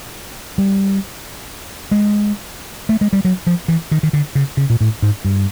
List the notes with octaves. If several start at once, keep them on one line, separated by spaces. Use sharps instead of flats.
G3
G#3
A3
G#3
G3
F#3
F3
E3
D#3
D#3
D3
C#3
C#3
A#2
A2
G#2
G2